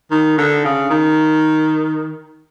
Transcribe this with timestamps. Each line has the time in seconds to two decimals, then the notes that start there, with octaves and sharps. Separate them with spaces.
0.11 D#3
0.38 D3
0.64 C#3
0.90 D#3